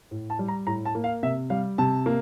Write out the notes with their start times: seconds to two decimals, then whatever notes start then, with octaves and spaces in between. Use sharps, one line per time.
0.11 A2
0.30 A5
0.39 G3
0.48 A#5
0.67 A2 A#5
0.85 A5
0.95 A#3
1.04 F5
1.23 C3 E5
1.50 G3 F5
1.78 C3 A5
2.06 A#3